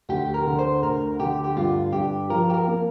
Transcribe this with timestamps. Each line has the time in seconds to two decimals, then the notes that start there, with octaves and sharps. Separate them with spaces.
0.09 D2 G4
0.34 A#4
0.46 D3
0.59 C5
0.83 D2 A#4
1.20 D3 G4
1.44 G4
1.56 G2 F4
1.93 G2 G4
2.30 F3 A#4
2.50 G4
2.54 A#4
2.67 A#3